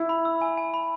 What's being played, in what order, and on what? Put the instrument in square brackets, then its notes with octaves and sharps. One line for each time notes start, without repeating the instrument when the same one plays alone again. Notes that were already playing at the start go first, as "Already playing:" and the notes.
Already playing: [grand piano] E4
[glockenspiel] B5
E6
G#5
G#5
B5